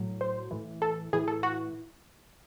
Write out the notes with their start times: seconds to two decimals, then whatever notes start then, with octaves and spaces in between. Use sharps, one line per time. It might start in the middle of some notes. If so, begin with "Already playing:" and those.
Already playing: A2 F#3
0.21 C5
0.51 A2 E3
0.82 A4
1.13 A2 E3 G#4
1.28 A4
1.43 F#4